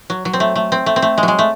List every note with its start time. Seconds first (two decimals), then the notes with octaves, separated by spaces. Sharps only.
0.10 F#3
0.25 F#3
0.33 C4
0.40 A3
0.56 A3
0.72 C4
0.86 A3
0.96 C4
1.02 A3
1.18 G#3
1.23 F#3
1.28 G#3
1.39 A3